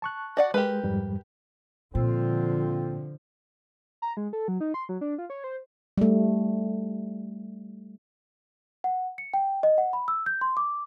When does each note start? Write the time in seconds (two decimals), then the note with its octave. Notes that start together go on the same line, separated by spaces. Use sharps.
0.02 A5 C#6 F#6
0.37 F#4 D5 F#5
0.54 G#3 G4 A#4 B4
0.83 F2 G#2 G3
1.95 A#2 D3 F3 C4 F4
4.02 A#5
4.17 G#3
4.33 A4
4.48 F#3
4.60 D#4
4.74 C6
4.89 F#3
5.01 D4
5.18 F4
5.30 C#5
5.44 C5
5.98 G3 A3
8.84 F#5
9.18 C#7
9.34 G5
9.63 D#5
9.78 F#5
9.93 B5
10.08 E6
10.26 G6
10.41 C6
10.57 D6